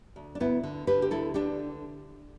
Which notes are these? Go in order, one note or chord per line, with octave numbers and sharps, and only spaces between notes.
D2
D4
D2 B3 E4
D3
D3 G4 B4
G4
D2 E4 A4
D3 D4 G4